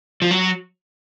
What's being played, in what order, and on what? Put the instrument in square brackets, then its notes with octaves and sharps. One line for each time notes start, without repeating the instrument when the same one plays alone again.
[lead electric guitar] F3
F#3